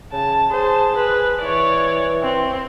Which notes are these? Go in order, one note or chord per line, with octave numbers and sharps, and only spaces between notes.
C#3 A5
G#4 C5 A5
B4
E3 C#5 D5
C4